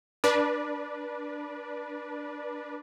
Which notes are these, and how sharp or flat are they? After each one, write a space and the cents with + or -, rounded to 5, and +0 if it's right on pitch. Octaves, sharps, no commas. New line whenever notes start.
D4 +0 B4 -30 D5 +0